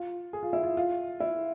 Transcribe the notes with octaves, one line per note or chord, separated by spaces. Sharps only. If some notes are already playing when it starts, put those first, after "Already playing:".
Already playing: F4
G#4
F4
E4
F4
F4
E4